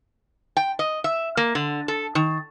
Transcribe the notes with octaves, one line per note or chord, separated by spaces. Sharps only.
G5
D#5
E5
A#3
D3
A4
D#3